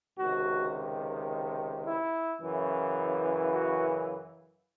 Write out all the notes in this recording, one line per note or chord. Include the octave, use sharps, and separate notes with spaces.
C#2 C3 D#3 F#4
E4
F#2 C#3 E3
F#4